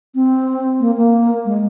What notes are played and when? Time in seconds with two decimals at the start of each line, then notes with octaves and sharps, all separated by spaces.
0.15 C4
0.80 A#3
0.97 A#3
1.45 G#3